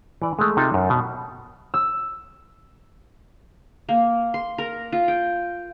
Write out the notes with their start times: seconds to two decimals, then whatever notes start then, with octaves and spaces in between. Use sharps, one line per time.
0.22 E3 D5
0.39 G#3 A3
0.57 C3 D#4 F4 A4
0.74 F#2
0.90 B2
1.74 E6
3.89 A#3
4.34 C6
4.58 A#4
4.92 F4
5.08 G5